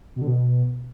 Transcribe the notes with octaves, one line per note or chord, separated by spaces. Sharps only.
B2
D3
B2